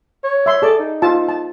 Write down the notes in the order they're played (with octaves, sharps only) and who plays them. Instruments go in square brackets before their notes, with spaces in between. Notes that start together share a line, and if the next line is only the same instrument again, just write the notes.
[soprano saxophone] C#5
[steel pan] E5 C6
[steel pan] G#4 D5 [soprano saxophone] A4
[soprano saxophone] D#4
[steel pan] F4 A5
A5